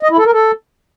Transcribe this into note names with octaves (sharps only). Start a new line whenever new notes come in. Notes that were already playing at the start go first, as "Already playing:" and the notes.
D#5
E4
A4
A#4
A4